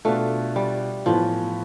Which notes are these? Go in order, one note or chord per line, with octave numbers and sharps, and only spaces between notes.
B2 A3 B3 D4 F4
G3
A2 E3 F3 B3